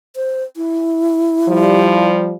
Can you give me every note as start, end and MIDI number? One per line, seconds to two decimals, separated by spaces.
0.16 0.44 72
0.57 2.09 64
1.49 2.34 53
1.49 2.34 55